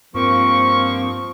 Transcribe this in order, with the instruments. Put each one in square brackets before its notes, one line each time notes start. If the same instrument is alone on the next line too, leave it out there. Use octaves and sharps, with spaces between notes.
[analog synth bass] G2 [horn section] F3 A#3 [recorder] C4 [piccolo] C#6